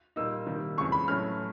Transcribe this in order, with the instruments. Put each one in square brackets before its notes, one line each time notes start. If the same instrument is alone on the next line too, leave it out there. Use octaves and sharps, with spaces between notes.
[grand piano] A#2 G3 A#3 D#4 E6
C3 D#3 G3 A#3
F2 C#3 E3 G#3 C#6
B5
A2 F#3 A3 C#4 F6